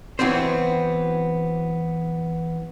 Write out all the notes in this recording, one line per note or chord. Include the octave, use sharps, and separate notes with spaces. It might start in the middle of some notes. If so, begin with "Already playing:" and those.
E3 F#3 B3 C4 C5